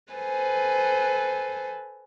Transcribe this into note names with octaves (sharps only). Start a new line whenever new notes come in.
A4 B4 C5 G#5